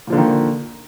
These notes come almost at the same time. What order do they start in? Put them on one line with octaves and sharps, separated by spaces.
A#2 F3 D3 A#3 D#3